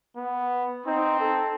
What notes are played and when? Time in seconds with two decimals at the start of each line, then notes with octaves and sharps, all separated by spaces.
0.16 B3
0.86 C4 D#4
1.20 A4